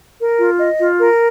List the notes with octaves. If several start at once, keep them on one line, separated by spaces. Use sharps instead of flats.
A#4
F4
D#5
F4
A#4